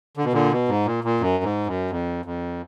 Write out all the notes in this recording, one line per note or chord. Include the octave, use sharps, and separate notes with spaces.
D3
B2
A#2 D3
B2
G#2
A#2
A#2
F#2
G#2
F#2
F2
F2